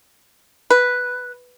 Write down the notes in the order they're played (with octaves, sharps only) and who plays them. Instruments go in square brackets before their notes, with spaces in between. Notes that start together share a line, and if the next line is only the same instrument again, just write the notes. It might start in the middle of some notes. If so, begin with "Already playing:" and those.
[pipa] B4